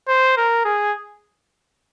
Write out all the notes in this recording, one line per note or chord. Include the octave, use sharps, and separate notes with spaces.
C5
A#4
G#4